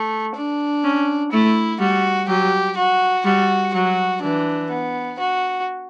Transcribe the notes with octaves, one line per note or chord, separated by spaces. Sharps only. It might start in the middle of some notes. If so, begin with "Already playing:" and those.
Already playing: A3
D4
C#4
A3 E4
G3 F#4
F#3 G4
F#4
G3 F#4
F#3 F#4
E3 D4
B3
F#4